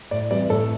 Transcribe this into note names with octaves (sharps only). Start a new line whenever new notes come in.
A2 D5
E3 G3 C4 D5
A2 A4